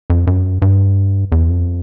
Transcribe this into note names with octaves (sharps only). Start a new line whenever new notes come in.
F2
F#2
G2
E2
F2